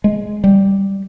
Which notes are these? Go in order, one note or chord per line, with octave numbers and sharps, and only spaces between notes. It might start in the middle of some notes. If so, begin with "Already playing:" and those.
G#3
G3